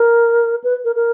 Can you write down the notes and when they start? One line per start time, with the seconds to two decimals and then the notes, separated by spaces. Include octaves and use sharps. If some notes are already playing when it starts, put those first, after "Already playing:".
Already playing: A#4
0.64 B4
0.85 A#4
0.96 A#4